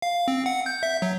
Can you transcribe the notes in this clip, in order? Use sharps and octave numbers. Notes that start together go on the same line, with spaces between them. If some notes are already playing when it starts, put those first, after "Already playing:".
F5
C4
F#5
G6
E5
F#3